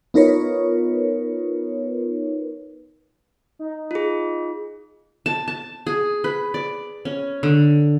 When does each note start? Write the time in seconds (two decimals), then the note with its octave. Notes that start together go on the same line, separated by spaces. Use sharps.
0.14 B3 D#4 F4 A#4 B4 C#5
3.59 D#4
3.91 F4 G#4
5.26 A5
5.48 A5
5.87 G#4
6.24 B4
6.54 D5
7.05 C#4
7.43 D3